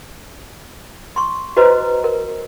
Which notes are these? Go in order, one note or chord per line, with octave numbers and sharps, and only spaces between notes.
C6 C#6
F#4 B4 C5 D#5 A#5
A#4